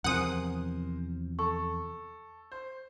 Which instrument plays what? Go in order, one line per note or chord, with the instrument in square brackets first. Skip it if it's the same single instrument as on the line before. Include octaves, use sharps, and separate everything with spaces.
[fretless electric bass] E2 C3 F3 [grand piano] A#4 C5 G#5 [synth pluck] F#5 D#6
[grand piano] A4 [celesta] C#6
[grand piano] C5